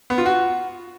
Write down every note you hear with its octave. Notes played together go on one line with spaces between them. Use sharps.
B3
F4
F#4